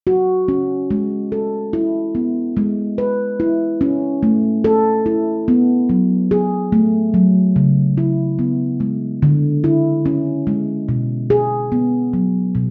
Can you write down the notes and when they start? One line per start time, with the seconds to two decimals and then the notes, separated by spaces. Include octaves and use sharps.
0.07 F#4
0.48 C#4
0.91 G#3
1.32 A4
1.73 E4
2.15 B3
2.57 G#3
2.98 B4
3.40 E4
3.81 C#4
4.23 A3
4.64 A4
5.06 E4
5.48 B3
5.89 F#3
6.31 G#4
6.72 A3
7.14 F#3
7.56 C#3
7.97 E4
8.39 B3
8.80 G#3
9.22 D3
9.64 E4
10.06 C#4
10.47 G#3
10.89 B2
11.30 G#4
11.72 B3
12.13 F#3
12.55 B2